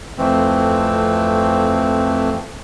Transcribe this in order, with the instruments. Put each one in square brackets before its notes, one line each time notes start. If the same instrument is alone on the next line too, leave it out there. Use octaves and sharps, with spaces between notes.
[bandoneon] F2 E3 A3 C4